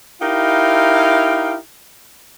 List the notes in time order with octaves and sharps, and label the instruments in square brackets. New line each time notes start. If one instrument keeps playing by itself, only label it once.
[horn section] D#4 E4 G4 A#4 F5